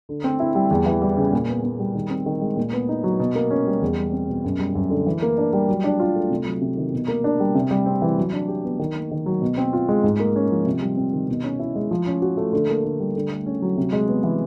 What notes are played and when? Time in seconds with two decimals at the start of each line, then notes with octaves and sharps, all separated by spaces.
0.09 D3
0.24 C4
0.40 E4
0.55 G3
0.71 E2
0.86 E3
1.02 G3
1.17 C#3
1.33 A#2
1.49 B3
1.64 A#2
1.80 G3
1.95 D#3
2.10 C4
2.26 D#3
2.41 G#3
2.57 A#2
2.73 B3
2.89 D#4
3.04 F#3
3.20 B2
3.35 A#3
3.51 C#4
3.67 G3
3.82 E2
3.98 G3
4.13 C4
4.28 B2
4.44 F#2
4.60 G3
4.75 F#2
4.90 D3
5.07 E3
5.22 A#3
5.38 D4
5.53 G3
5.68 F#3
5.84 D4
6.00 F4
6.16 A3
6.30 C3
6.46 F#3
6.62 C3
6.77 D#3
6.93 B2
7.08 A#3
7.24 D4
7.40 G3
7.55 C3
7.71 G3
7.86 C4
8.02 E3
8.18 F#3
8.33 D4
8.48 G4
8.64 B3
8.79 D#3
8.95 A#3
9.11 D#3
9.26 F#3
9.42 B2
9.58 C4
9.73 F4
9.89 G#3
10.04 G#2
10.20 A#3
10.36 C#4
10.51 F3
10.66 C3
10.82 G3
10.97 C4
11.13 D#3
11.29 B2
11.44 C#4
11.59 E4
11.76 G#3
11.91 F3
12.06 C#4
12.22 F#4
12.37 A3
12.53 D3
12.69 A#3
12.85 D3
13.00 G3
13.16 D3
13.31 A3
13.46 C#4
13.62 F#3
13.77 C3
13.92 G#3
14.08 B3
14.24 E3